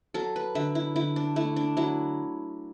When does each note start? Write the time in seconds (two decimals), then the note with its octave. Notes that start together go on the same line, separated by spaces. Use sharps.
0.14 F#3 A4
0.36 B4
0.55 D3 E5
0.75 E4
0.96 D3 E4
1.16 D4
1.36 A3 E4
1.56 D4
1.77 F#3 E4